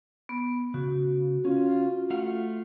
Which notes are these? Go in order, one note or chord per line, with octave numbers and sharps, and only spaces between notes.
B3
C#3 F#4
C#4 F4
A3 F4 F5 F#5